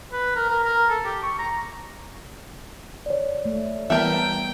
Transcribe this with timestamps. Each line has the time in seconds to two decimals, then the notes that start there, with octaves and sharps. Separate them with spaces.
0.12 B4
0.36 A#4
0.50 A#4
0.64 A#4
0.89 A4
1.05 G4
1.23 C#6
1.39 A#5
3.06 C#5 D5
3.45 A3
3.90 E3 G3 A3 B3 A#4 E5 G5